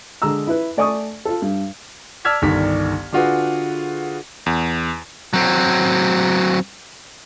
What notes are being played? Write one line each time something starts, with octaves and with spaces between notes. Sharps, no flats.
D3 G#3 A#5 E6
E4 B4
A3 D5 G#5 C#6 D#6
F4 A4
G2
D5 A5 E6 F6 G#6 B6
G1 C2 D#3 B6
D3 D4 F4 F#4 G#4 B4
E2
F#3 C4